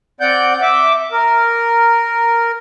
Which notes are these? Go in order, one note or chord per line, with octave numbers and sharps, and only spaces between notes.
C4 D5 F#5 G6
E5 D6
A#4